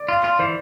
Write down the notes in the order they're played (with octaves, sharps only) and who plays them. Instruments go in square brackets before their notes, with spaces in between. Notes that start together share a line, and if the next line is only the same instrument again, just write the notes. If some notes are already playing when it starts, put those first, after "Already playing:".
Already playing: [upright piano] D5
[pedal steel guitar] F4
F4
[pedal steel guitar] E3 [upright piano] C5